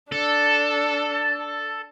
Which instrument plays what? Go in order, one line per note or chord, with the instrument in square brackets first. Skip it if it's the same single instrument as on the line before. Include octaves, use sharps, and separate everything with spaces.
[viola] D4 [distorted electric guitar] A4